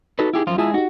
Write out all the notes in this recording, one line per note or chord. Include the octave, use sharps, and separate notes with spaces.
D#4 F#4 A4 B4
E4 G4 G#4
F#2 F3 F4
G#3 E4 F4 G#4 A5 E6
D#4 F#4 G4